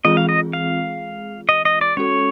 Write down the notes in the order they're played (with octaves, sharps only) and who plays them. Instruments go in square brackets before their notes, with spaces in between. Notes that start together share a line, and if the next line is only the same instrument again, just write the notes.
[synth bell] E3 G#3 C4 F4 G#4 [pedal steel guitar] D#5
[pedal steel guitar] F5
D#5
F5
D#5
D#5
D5
[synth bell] G#3 C#4 F#4 A4 [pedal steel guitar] C#5